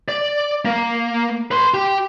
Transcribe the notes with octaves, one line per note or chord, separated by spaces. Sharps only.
D5
A#3
B4 C6
G4